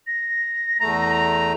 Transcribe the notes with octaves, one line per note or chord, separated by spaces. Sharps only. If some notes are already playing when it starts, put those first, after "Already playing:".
A#6
E2 A3 A#5